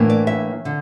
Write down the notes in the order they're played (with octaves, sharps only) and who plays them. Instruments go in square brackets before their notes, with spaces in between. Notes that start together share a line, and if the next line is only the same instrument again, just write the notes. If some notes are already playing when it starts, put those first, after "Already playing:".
Already playing: [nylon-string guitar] A2 E3 A#3 D4
D5
E5
D3